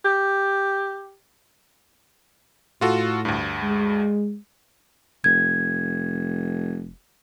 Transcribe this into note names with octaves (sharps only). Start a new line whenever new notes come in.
G4
A2 F4 F#4 A4
D2 G2
G#3
F1 G#6